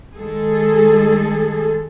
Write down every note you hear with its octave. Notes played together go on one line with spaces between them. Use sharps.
D#3 G#3 G#4 A4